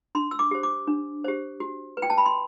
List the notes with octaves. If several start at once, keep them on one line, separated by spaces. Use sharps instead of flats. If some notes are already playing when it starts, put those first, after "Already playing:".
D4 C6
E6
D6
G4 C5
D6
D4
G4 C5
F#4
B4
G5
A5
B5
C6